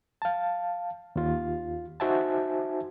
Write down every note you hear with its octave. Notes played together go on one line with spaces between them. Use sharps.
F5 A5
D#2 F4
D#4 F#4 C5 E5 G#5 A5